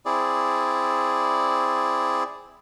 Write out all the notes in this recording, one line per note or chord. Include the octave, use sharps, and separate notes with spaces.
C4 E4 G#4 D5